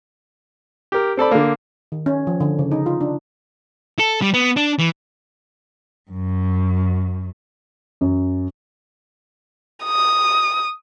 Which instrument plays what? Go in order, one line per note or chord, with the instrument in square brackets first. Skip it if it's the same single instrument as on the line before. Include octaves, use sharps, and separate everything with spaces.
[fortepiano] G4 A#4
C4 A4 D5 B5
D3 A#3
[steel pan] D#3
C#4
F3
D3
C#3
D#4
F4
D4
[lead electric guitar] A4
G3
B3
D4
E3
[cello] F#2
[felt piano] F#2
[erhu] D#6